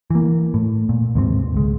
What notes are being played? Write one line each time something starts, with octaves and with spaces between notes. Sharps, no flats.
E3 A#3
A2
A#2
D#2 G#2 C3 C4
C#2 G#3